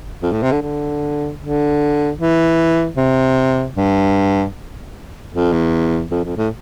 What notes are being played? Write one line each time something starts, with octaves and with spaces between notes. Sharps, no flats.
F2
A2
C3
D3
D3
D3
E3
C3
G2
F2
E2
F2
F2
A2